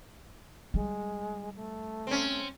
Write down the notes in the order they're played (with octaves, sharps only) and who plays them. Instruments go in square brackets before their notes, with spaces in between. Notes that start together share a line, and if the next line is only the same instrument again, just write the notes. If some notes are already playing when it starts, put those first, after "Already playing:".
[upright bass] G3 [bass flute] G#3
[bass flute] A3
[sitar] C4 C#4